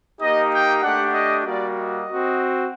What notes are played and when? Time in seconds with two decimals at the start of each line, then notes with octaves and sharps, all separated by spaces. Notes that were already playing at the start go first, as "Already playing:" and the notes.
0.21 A#3 D#4 G4 D#5
0.52 G5
0.82 A3 D4 G4 F#5
1.13 D#5
1.44 G3 A#3 F#4 D5
1.76 D#5
2.06 C4 F#4